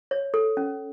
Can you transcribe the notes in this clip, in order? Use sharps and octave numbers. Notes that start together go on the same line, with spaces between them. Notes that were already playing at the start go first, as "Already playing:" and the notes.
C#5
A4
C#4